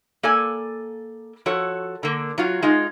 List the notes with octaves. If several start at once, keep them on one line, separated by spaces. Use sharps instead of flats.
A#3 A4 D5 G#5
F3 F#4 A4 C#5
D3 A#3
F#3 F4 F#4
G#3 D#4 F4